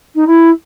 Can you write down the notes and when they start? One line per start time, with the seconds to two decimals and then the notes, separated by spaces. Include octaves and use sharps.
0.15 D#4
0.27 E4